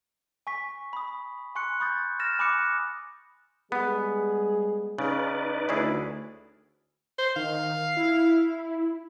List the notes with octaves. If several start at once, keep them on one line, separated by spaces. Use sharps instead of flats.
G#5 C#6 B6
B5 D#6
G#5 C6 C#6 F#6 C#7
B5 C#6 D#6 G6 A6
F6 A6 A#6 E7
G#5 B5 D6 D#6 F#6 C#7
G3 G#3 B3 G#4
C#3 D#4 B4 D5
D2 C#4 E4 G#4
C5
D#3 F5
E4